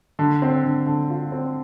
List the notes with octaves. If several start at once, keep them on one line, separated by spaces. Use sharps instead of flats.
D3
C4
D3
D3
F4
C4